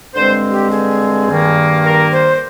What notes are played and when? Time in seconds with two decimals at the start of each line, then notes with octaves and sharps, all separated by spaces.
0.14 G2 D3 G#3 C4 C5
0.52 G4
0.71 G#4
1.28 G2 D#3 A#3
1.85 A#4
2.13 C5